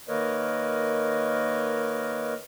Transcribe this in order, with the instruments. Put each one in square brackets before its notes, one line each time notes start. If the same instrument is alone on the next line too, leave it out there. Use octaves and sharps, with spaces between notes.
[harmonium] D#3 A#3 A#4 B4 C#5 D#5